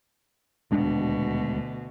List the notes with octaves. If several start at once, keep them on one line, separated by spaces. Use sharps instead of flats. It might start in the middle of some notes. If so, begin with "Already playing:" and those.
D#1 D2 B2 G#3 D4